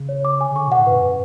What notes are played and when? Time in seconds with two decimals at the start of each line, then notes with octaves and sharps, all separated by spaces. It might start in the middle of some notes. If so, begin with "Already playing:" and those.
Already playing: C#3
0.09 C#5
0.25 D6
0.41 G#5
0.51 C#3
0.55 D3 C#6
0.67 B2 F#5
0.79 A2
0.87 F#2 B4
1.03 B4